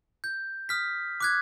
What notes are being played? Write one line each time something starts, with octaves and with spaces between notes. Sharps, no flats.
G6
D#6 F6 B6
D6 F#6 G#6